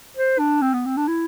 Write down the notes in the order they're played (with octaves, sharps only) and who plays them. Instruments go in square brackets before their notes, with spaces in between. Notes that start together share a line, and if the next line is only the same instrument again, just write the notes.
[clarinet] C5
D4
C4
B3
C4
D4
E4